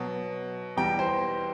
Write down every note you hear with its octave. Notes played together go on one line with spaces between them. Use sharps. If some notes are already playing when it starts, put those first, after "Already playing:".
Already playing: B2 F#3
E2 B2 G3 G5
C5